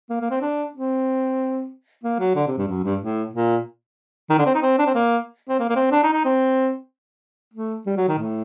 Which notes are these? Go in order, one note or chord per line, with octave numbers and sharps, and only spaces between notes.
A#3
A#3
C4
D4
C4
A#3
F#3
D3
C3
G2
F#2
G2
A2
A#2
D#3
D3
C4
D#4
C4
D4
C4
A#3
C4
A#3
A#3
C4
D4
D#4
D#4
C4
A3
G3
F#3
D#3
A2